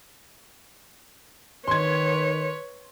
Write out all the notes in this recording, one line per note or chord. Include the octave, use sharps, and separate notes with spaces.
D#3 B4 C#5 C6 G#6